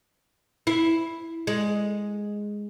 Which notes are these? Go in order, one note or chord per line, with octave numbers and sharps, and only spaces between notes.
E4
G#3